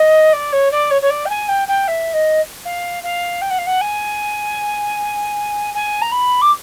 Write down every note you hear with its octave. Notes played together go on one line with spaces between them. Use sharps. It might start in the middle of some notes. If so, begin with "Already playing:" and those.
Already playing: D#5
D5
C#5
D5
C#5
C#5
D5
G5
G#5
G5
G5
E5
D#5
F5
F5
G5
F#5
F5
F#5
G#5
G#5
A#5
B5
D6